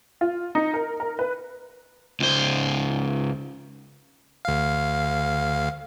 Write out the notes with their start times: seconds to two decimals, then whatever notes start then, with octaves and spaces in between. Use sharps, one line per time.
0.21 F4
0.55 D#4
0.74 A#4
1.00 A#4
1.19 B4
2.20 C#2 C5
4.45 D2 F5